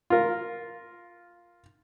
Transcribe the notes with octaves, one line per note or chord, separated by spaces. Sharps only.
F4 A#4